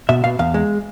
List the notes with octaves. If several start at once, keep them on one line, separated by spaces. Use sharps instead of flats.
B2 E5
B2 F5
E2 F5
G#3